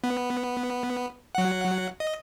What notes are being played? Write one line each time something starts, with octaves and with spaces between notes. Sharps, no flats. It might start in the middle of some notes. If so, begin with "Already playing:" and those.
B3
F#3 F#5
D#5